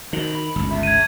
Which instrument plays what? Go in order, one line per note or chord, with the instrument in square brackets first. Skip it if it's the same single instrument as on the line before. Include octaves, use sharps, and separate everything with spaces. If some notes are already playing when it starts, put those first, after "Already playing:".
[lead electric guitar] C3 F#4 [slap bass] D#3
[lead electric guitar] B5
[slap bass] G1 C#2
[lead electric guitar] G#4 E5
[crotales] G#6 D#7